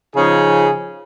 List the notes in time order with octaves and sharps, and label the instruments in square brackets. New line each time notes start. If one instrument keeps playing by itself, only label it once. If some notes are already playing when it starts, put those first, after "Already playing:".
[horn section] C#3 F3 C#4 D#4 G#4